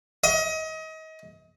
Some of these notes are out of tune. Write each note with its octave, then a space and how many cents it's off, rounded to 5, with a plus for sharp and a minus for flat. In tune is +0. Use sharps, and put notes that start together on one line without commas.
D#5 +30